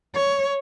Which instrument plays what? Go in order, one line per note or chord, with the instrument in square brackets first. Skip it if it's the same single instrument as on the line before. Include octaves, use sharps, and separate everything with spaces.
[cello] C#5